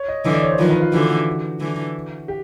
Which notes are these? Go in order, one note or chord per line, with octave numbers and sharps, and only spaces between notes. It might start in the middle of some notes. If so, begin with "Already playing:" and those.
Already playing: C#5
D#5
D3 E3 D#5
D5
C#5
C5
D#3 F3 B4
B4
F4
D3 E3 F#4
D3 E3
G4